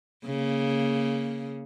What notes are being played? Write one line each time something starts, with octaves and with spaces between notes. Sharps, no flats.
C#3 A#3